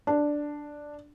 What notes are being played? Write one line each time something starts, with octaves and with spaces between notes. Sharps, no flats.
D4